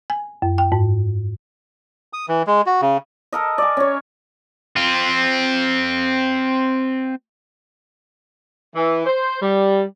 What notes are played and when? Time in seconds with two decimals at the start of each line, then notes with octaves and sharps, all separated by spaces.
0.10 G#5
0.42 F#2
0.58 G5
0.72 G#2
2.13 D#6
2.29 E3
2.47 G#3
2.66 F#4
2.81 C#3
3.32 A4 A#4 D#5
3.58 D5 G#5
3.77 C#4 C#5
4.76 C4 F4
8.75 E3
9.06 C5
9.42 G3